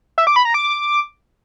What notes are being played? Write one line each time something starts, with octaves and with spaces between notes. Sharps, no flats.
E5
D6
B5
A#5
D6